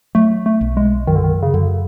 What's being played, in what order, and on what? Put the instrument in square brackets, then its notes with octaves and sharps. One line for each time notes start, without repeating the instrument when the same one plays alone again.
[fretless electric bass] F#3 [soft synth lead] A3
[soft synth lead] A3
[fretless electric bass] B1
[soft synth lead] G#3
[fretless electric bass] F#2 [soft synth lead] D#3
[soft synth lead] D3
D#3
C#3
[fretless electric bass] F#2 [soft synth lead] D3